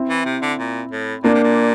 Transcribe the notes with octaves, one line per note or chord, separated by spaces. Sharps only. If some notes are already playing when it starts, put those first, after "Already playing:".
Already playing: C4 E4
E3
C3
D3
A#2
A2
A#2 A#3 D4
C3
A#2